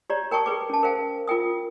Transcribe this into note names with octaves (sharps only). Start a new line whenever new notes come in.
G4 C#5 D5 A#5
A#4 G5 A5 C#6 D#6
G#4 B4 D6
C#4 A5
A#4 C5 F5 G5
F4 A#4 G5 D#6